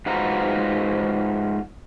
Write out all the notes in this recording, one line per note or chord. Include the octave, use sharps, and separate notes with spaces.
G#2 D#4 F4 F#4 B4 A#5